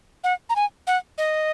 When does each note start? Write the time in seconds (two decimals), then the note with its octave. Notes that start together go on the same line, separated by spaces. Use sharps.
0.24 F#5
0.50 A#5
0.56 G#5
0.87 F#5
1.18 D#5